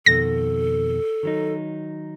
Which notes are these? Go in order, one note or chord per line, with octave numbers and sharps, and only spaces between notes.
F2 B2 D#3 A4 A#6
D#3 F#3 D#4